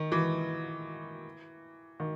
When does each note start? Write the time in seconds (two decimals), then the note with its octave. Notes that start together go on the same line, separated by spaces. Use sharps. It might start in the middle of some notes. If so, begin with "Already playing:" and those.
Already playing: D#3
0.12 E3
2.00 D#3